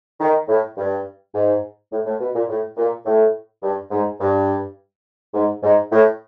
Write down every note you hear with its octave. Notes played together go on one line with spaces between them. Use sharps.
D#3
A2
G2
G#2
A2
A2
B2
A#2
A2
A#2
A2
G2
G#2
G2
G#2
G#2
A2